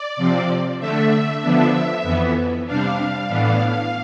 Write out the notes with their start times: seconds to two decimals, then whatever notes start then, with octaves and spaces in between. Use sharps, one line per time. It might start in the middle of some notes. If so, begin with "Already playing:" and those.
Already playing: D5
0.16 C3 F3 C4
0.79 D3 A3 D4 E5
1.41 D3 F3 B3 D4
2.03 F2 E3 B3
2.65 C3 G3 D4 F5
3.28 A2 E3 B3 D4